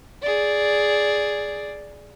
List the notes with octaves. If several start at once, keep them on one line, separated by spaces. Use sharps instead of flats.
G#4 D5